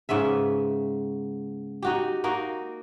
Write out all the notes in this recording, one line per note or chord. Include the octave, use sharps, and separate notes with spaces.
G#2 C#3 B3 E5
D#4 F#4 G4
A#3 D#4 F#4